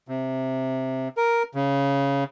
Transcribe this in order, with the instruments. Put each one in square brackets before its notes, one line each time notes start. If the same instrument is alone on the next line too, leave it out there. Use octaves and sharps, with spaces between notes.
[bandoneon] C3
A#4
C#3